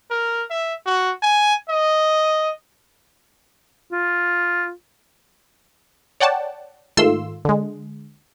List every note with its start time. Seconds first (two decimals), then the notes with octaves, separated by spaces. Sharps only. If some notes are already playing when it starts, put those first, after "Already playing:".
0.11 A#4
0.50 E5
0.86 F#4
1.23 G#5
1.69 D#5
3.92 F4
6.20 C#5 D5 F#5 G5 A5
6.97 G#2 D#3 A3 F4 C6 E6
7.45 D3 G#3